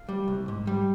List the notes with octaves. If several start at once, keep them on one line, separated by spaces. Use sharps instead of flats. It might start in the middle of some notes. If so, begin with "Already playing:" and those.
Already playing: F5
G3
C2
G#2
G3